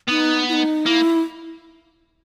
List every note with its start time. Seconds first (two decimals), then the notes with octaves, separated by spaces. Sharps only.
0.09 B3 D#4
0.48 E4
0.53 D#4
0.86 A#3 E4